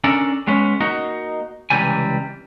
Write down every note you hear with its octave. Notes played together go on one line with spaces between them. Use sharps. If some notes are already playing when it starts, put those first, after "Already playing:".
C#4 D4 A4 A#4
G#3 B3 C#4
A#3 D#4 F#4
C#2 C3 E3 G3 G#5